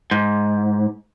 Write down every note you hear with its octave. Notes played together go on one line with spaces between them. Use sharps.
G#2